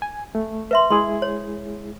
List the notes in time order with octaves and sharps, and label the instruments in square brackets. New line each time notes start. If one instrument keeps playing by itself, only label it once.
[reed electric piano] G#5
A3
[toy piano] B4 E5 C6
[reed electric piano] G#3 E4 G#4 [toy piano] C6
[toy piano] C#5